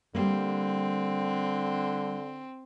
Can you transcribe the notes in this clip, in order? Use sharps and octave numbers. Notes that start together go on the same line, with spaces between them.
D3 G3 A#3 C4